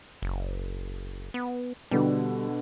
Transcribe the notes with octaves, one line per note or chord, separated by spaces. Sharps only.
F#1
B3
B2 D3 G3